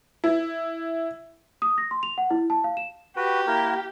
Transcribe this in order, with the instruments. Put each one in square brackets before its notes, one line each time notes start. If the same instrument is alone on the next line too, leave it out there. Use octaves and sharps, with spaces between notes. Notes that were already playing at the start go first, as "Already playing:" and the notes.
[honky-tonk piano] E4
[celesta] D#6
A#6
C6
F7
F#5
E4
A5
F5
E7
[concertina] F#4 B4 [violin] G4
[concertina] A#3 E4 A#4